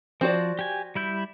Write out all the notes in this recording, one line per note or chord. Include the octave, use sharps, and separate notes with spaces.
F3 C4 F#4 D5
G4 G#5
G3 E4 G6